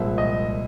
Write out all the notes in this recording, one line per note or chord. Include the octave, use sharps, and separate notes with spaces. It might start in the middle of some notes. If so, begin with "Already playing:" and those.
Already playing: C2 A#2 F3 G#3 E5
D#5